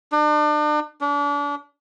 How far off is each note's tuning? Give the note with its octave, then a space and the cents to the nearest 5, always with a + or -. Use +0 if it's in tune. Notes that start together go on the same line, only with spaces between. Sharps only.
D4 +40
D4 -35